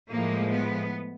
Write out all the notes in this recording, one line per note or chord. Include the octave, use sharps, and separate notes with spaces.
A2 F3 G#3 A#3
B3